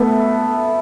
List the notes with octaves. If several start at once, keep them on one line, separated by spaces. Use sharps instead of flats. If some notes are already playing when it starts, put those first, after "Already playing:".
Already playing: A3 B3